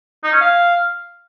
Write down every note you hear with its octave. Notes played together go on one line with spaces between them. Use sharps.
D#4
C#4
F5